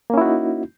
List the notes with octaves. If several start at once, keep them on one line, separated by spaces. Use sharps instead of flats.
A#3 C#4 D#4 E4 F#4